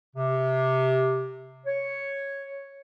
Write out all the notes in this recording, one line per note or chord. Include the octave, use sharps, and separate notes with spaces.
C3
C#5